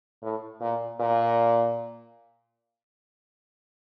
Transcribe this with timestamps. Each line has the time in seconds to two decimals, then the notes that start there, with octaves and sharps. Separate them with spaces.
0.23 A2
0.61 A#2
1.00 A#2